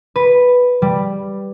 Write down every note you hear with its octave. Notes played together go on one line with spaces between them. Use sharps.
B4
G3